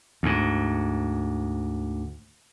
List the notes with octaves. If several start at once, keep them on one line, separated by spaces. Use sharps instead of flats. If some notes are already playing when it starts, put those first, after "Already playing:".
D2 G#2